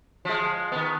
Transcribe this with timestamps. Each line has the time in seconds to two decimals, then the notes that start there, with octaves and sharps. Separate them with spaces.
0.25 F3 G#3
0.72 D#3 B3